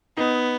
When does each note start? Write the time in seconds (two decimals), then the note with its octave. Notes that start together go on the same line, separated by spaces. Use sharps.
0.17 B3 D#4